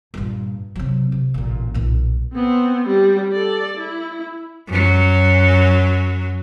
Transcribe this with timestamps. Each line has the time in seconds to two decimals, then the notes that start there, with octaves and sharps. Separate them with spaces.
0.14 G2 A#2
0.76 C3 F#3
1.12 C3
1.34 A1 A#2
1.74 B1 A#2
2.34 B3 C4
2.88 G3
3.33 A4 D5
3.77 E4
4.68 F#2 F#3